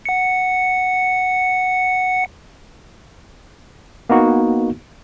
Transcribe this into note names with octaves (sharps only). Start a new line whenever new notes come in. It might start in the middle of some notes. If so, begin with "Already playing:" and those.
F#5 C#7
A#3 B3 D#4 F#4